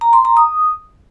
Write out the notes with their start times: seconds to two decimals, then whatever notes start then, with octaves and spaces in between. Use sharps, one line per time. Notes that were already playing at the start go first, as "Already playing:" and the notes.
0.01 A#5
0.13 C6
0.25 A#5
0.37 D#6